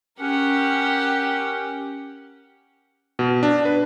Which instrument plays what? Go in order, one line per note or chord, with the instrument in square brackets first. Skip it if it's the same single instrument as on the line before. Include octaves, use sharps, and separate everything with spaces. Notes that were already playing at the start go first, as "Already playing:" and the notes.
[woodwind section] C#4 [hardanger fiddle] G4 [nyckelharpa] A#4 F#5
[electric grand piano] B2
D4
B4